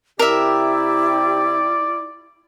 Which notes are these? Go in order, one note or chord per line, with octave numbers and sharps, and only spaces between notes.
C3 E4 G4 A#4 D5 E5